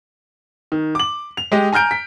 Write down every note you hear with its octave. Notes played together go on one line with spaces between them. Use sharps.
D#3
D6 F#7
F7
G#3 G4 D#5
G#5 A#5 F6 G6 D7
B6